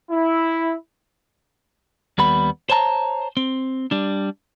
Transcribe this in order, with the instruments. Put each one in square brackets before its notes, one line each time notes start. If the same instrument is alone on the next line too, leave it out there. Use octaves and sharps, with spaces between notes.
[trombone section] E4
[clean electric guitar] D#2 G3 B3 B5
C5 C#5 A5 A#5
C4
G3 D4